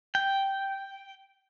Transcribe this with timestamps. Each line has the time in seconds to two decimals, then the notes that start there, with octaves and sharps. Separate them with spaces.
0.15 G5